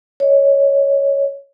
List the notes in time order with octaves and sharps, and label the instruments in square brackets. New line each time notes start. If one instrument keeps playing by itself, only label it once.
[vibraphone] C#5 D#5